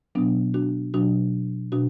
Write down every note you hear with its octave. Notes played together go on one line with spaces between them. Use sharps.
B2 F#3 B3 D4
D4 F#4
B2 F#3 D4 F#4
B2 D4 F#4